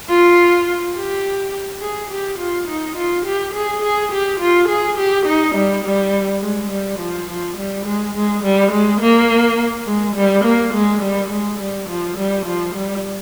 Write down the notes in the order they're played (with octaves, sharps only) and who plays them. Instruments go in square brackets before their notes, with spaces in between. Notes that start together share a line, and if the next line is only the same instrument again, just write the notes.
[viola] F4
G4
G#4
G4
F4
D#4
F4
G4
G#4
G#4
G4
F4
G#4
G4
D#4
G3
G3
G#3
G3
F3
F3
G3
G#3
G#3
G3
G#3
A#3
G#3
G3
A#3
G#3
G3
G#3
G3
F3
G3
F3
G3